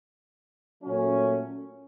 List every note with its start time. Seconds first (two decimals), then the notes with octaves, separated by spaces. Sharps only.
0.82 A#2 F#3 A3 C#4